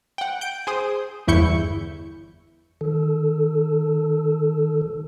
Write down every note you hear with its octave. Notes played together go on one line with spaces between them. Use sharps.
F#5 G5
G6 D7
G#4 C5 D#6
G1 E2 E4 C#6 G6 C#7
D#3 A4